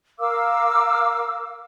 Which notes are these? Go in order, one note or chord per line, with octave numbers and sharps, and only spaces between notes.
A#4 F5 D6 E6